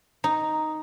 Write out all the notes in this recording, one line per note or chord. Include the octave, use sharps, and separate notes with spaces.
D#4